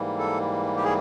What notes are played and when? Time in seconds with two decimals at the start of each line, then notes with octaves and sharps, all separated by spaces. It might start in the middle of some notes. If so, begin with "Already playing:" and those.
Already playing: G#2 E3 G3 A#3
0.19 A4
0.76 G4
0.84 G#4